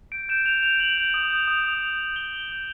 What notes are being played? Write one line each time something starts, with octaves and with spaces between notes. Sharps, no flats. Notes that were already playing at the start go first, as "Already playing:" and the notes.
G6 D7
G6 E7
G6 F7
G6 F7
G6 F#7
G6
D#6
G6
D#6
D#6
D#6
G6
D#6 G7
D#6
G6